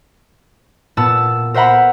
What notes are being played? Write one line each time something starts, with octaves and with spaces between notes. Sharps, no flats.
A#2 B3 A5 E6
A#4 C5 E5 F#5 A#5 B5